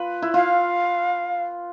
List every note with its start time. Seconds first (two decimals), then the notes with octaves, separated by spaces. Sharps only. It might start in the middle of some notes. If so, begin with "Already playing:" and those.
Already playing: F4 B4
0.22 E4
0.34 F4 F5